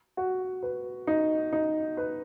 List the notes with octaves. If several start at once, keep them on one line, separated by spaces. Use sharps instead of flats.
F#4
B4
D#4
D#4
B4